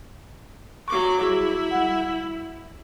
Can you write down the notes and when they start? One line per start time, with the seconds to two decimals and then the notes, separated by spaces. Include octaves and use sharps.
0.88 F#3 C#6 D6
1.20 G3 E4 F#4 G#4
1.71 G3 F#5